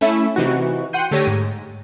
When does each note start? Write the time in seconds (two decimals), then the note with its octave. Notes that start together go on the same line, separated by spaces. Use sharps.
0.01 A3 C#4 E4 E5
0.36 C3 E3 D#4 F#4
0.93 F#5 G5 C6 G6 D#7
1.11 D3 A3 G4 C#5 A#6 D#7
1.27 G#2